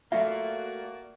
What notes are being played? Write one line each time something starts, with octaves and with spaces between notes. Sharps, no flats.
A3 A#3 F4 F#4 D5 E5